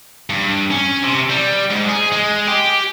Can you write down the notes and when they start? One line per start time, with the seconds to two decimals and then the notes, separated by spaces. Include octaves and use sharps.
0.30 G2
0.71 C#4
1.03 C3
1.30 G3
1.70 G#2
1.88 G#4
2.12 G#3
2.48 G4